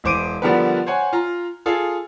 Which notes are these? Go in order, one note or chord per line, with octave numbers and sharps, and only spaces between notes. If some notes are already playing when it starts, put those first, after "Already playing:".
E1 E3 C5 D6 D7 D#7
D3 F3 G3 B3 A#4 B4
C5 C#5 F#5 G#5
F4 A#5
F4 G#4 A4 F5